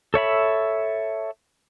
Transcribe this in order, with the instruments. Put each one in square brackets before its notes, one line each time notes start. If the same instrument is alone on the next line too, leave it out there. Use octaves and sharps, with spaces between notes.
[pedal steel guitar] A4 C#5 E5 B5